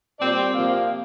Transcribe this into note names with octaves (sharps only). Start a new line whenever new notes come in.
A#2 G3 C4 D5
C3 F3 A#3 F5